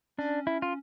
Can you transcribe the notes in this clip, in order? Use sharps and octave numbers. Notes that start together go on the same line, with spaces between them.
C#4 D4
E4
F4